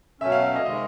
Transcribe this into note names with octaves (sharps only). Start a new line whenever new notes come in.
B2 F#3 A3 C#4 E5
F5
E5
D#5
C3 D#3 G#3 D#5